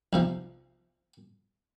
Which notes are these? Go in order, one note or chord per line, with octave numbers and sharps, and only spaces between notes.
B1 C3 F3